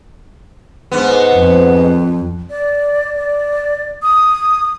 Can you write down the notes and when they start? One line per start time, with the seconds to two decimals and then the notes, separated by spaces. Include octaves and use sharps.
0.92 G#2 B3
1.34 F2
2.50 D5
3.15 D5
4.03 D#6